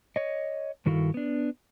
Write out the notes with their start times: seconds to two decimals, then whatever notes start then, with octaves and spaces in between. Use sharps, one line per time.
0.16 C#5 D#5
0.86 G2 D#3 E4 F#4 A4 F5
1.14 B3 D4